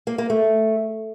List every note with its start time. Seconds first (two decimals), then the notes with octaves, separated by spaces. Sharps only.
0.07 A#3
0.18 A#3
0.30 A3